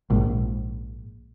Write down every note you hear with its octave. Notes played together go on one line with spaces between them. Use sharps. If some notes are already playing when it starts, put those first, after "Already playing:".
A#1 G#2